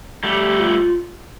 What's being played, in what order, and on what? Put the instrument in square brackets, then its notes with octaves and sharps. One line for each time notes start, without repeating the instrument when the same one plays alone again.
[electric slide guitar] G3 A3 [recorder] G4
[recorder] F4